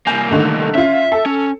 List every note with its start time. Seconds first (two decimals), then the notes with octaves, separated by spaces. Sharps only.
0.07 C2 A#3 G#5 G6
0.31 D3 D#3 A3
0.75 C#4 F4 E5
1.12 A4
1.26 C#4